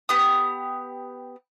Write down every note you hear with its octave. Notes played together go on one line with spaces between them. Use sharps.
B3 G4 D#6